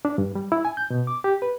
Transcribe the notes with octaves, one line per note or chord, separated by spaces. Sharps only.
D4
G2
G3
E4
G#5
G6
B2
D6
G4
B4